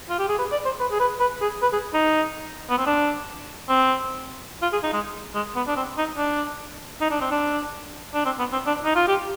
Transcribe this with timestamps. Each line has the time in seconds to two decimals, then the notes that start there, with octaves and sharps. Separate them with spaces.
0.10 F4
0.19 G4
0.29 G#4
0.39 B4
0.52 D5
0.65 C5
0.80 B4
0.91 G#4
1.00 B4
1.20 B4
1.41 G#4
1.62 B4
1.73 G#4
1.94 D#4
2.70 B3
2.78 C4
2.87 D4
3.69 C4
4.62 F4
4.73 G#4
4.83 D#4
4.93 G#3
5.35 G#3
5.56 B3
5.67 D4
5.76 C4
5.98 D#4
6.17 D4
7.01 D#4
7.11 D4
7.21 C4
7.31 D4
8.14 D4
8.26 C4
8.39 B3
8.53 C4
8.67 D4
8.85 D#4
8.96 F4
9.08 G4